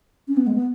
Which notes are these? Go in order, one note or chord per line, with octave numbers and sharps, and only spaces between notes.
C#4
B3
G#3
B3